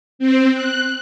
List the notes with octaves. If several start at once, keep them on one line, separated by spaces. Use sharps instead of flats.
C4
F#6